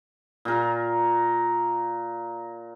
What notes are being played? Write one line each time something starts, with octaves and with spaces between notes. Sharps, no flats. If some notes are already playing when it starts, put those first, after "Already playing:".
A#2 A#4